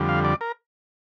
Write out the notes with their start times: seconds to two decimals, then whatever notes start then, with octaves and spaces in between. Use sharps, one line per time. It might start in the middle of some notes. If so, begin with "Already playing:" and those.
Already playing: F2 D3 G3
0.09 F5
0.25 D5
0.41 A#4